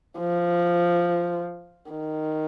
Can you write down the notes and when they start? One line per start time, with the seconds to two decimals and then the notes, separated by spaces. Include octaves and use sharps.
0.19 F3
1.91 D#3